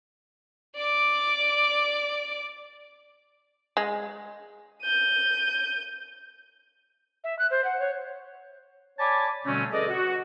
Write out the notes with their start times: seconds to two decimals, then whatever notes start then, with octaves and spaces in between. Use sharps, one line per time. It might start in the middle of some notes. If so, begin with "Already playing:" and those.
0.76 D5 D6
3.77 G#3
4.82 G6 D#7
7.24 E5
7.39 F#6
7.51 C5
7.64 F#5
7.80 C#5
8.99 C#5 D5 G#5 A5 B5 D6
9.45 B2 D3 G3 A3 C4 C#4
9.72 G#4 A4 B4 D5 D#5
9.89 F#4